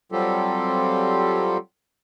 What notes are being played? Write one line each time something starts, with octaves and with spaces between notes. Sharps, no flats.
F#3 G3 C4 F4 G4 A4